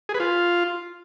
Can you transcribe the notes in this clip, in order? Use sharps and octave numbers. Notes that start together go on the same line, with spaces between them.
G#4
B4
F4